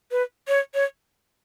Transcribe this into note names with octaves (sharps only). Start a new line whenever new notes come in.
B4
C#5
C#5